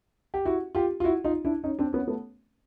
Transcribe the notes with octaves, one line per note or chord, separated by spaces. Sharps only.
G4
E4 F#4
F4 G4
F4
E4 F#4
D#4 F4
D4 E4
C#4 D#4
C4 D4
B3 C#4
A3 B3